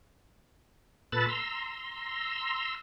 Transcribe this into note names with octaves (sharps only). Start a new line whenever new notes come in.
A#2 A4 B4 A5 B5 A6
A#5 C6 E6